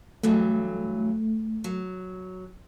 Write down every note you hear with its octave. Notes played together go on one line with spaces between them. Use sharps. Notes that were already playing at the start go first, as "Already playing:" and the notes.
G2 E3 F#3 A3
F#3